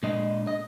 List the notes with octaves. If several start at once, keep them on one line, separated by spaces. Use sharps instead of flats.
A#2 G#3 D4 D#5
D#5